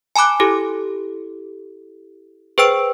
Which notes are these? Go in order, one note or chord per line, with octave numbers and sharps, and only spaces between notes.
G#5 A5 B5 D6 F#6
E4 G4 A4
G#4 B4 C5 G5 E6 D7